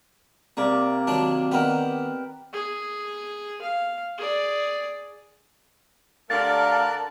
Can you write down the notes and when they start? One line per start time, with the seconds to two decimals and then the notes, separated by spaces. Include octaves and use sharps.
0.57 C3 G3 A#3 D5
1.07 D#2 F#3 D4
1.52 D#3 B3 A#4 B4 G5
2.53 G#4
3.62 F5
4.18 G#4 D5
6.30 D3 A3 G4 A#4 D5 F5 A5 F#6